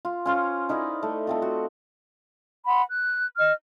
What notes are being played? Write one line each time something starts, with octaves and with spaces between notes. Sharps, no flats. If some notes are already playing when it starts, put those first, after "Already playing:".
F4
C#4 F4 C5
D#4 E4 A#4 D5
A3
A3 C4 F4
F#4
F#5 B5 C6
F#6
D#5 F6